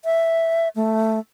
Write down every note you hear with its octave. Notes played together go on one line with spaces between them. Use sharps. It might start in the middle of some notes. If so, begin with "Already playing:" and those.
E5
A3